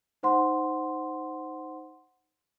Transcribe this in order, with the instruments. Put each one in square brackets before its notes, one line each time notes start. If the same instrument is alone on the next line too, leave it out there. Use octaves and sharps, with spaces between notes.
[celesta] D#4 C5 F#5 C6